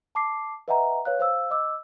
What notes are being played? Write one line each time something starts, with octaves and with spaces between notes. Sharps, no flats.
A5 D6 C7
B4 D#5 E5 F#5 G#5 A#5
B4 C#5 F5 F#6
C5 F5 E6
D#5 D6 E6